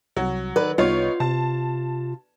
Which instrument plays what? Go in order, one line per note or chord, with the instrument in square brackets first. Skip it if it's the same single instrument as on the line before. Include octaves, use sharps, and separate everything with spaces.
[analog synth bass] C2 [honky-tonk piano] F#3
[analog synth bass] D#3 [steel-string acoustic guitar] B4 D5
[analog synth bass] C2 [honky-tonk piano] B3 D#4 C#5 [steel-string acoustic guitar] F4
[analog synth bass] C3 [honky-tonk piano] A5